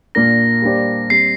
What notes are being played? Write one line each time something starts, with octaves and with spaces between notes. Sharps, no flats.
A#2 A#3 D4 A#4 A#6
G3 A#3 D4 G4 C5
G3 C4 C7